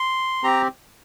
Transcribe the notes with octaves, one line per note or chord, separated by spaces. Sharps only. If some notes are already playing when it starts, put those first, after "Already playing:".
Already playing: C6
C4 G4 A#5